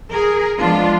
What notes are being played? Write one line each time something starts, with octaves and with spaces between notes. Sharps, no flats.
G#4 A#4
F3 G#3 B3 D4 F4